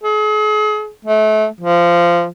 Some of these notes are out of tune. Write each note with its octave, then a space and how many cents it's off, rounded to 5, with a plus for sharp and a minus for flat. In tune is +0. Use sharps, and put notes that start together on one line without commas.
G#4 +40
A3 -30
F3 -15